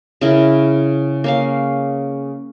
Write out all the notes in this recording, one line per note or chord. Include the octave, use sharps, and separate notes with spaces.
C#3 E4 A#4
A#3 C#4 F5